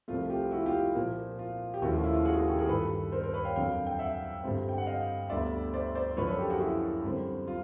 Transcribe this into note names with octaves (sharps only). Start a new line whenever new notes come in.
C2 C3 F3 A3 F4
F4 G4
E4 F#4
F4 G4
F4
A#2 F3 A#3
F4
G4
D#2 C#3 F3 A3 C#4 E4 F#4
F4
E4
F4
F#4 G#4
F#4 G#4
G4 A4
G#4 A#4
G2 D#3 G3 A4 B4
A#4 C5
A#4 C5
B4 C#5
F5 G5
F2 D3 F#3 F5 G5
G5
E5 F#5
G2 D3 G3 C4
G5
F#5
D#5 F5
D2 D3 G3 B3 D5 E5
C5 D5
C5 D5
F#2 D3 F3 A#3 C#4 B4 C#5
A4 B4
G4 A4
F#4 G#4
E4 F#4
F#2 D3 G3 C4
F4